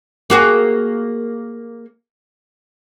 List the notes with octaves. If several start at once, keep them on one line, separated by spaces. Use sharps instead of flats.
A#3 F#4 G#4